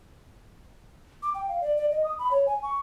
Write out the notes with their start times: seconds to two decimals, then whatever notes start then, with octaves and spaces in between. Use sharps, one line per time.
1.22 D6
1.34 G5
1.49 F5
1.61 D5
1.77 D5
1.91 D#5
2.04 D#6
2.19 B5
2.31 C#5
2.47 G#5
2.63 C#6